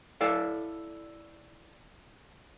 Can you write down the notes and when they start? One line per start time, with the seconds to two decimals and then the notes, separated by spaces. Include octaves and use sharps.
0.21 E4 A4 D5 F5